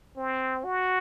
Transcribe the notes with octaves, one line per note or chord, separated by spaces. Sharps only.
C4
F#4